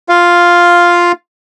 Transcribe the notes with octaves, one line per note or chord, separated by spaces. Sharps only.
F4 F5